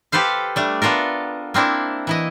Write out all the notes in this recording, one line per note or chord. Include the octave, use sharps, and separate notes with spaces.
G4 A4 B4 C5 F5
G3 A3 D4
B3 D4 F4 A4 A#4
A#3 C4 D4 E4
E3 E4 D#5